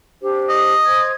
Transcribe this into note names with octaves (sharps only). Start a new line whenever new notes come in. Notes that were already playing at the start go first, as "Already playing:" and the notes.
D4 G4 C5
D#5
C5 G#6